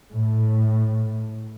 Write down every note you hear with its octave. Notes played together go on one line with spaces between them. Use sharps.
A2